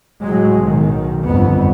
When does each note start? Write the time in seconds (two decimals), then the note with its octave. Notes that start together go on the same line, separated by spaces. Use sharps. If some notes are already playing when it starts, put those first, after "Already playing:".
0.23 A2 F#3 G#3
0.63 B1 D#3
1.25 G1 F2 B3